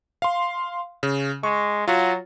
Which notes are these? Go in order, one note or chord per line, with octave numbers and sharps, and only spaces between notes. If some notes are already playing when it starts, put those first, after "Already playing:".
F5 C6
C#3
G#3 C#6
F#3 F4 F#4